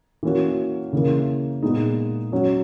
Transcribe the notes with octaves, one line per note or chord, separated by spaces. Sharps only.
E3 A#3 C#4 F#4
C#3 E3 A#3
A#2 G#3 B3 D#4
F#3 C#4 F#4